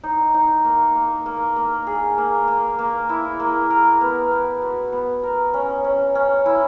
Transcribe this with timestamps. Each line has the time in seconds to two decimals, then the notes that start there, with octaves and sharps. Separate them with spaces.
0.03 D#4
0.34 D#4
0.64 A#3
0.95 A#3
1.26 A#3
1.56 A#3
1.87 G#4
2.18 A#3
2.48 A#3
2.79 A#3
3.09 E4
3.40 A#3
3.70 A#4
4.01 B3
4.31 B3
4.62 F#4
4.92 B3
5.23 A#4
5.54 C#4
5.84 C#4
6.15 C#4
6.46 E4